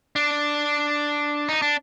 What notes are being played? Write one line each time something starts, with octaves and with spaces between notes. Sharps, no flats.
D4
D#4
D4